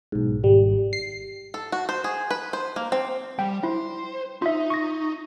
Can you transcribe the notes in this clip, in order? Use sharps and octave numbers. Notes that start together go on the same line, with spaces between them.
B1 G#2
G#1 G3
C7
A4
F#4
C5
G#4
B4
C5
A#3
C4
G3 G5
E4 C5
D#4 F4 E5
C#6 A#6